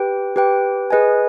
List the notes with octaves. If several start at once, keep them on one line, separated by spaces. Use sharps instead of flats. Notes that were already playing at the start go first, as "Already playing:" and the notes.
Already playing: G4 B4 G5
G4 B4 G5
G#4 B4 D#5 G#5